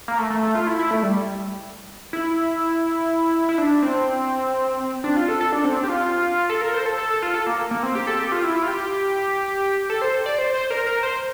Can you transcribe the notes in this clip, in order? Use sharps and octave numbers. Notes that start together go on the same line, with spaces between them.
A#3
A3
A3
A3
F4
E4
E4
A3
G3
E4
E4
D4
C4
D4
F4
A4
A4
D4
C4
D4
G4
F4
A4
A#4
C5
A4
A4
A4
F4
A4
A#3
A#3
C4
G4
A4
G4
F4
E4
F4
G4
A4
C5
D5
C5
C5
A#4
A#4
C5